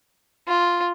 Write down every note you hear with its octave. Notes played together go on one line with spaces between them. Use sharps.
F4